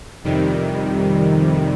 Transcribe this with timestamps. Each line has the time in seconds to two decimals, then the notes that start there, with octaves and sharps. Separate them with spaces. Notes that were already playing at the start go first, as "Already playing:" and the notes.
0.24 F2 C3 D#3 G3